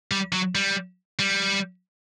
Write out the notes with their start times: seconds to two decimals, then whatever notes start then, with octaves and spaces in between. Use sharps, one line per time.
0.11 G3
0.33 F#3
0.55 G3
1.19 G3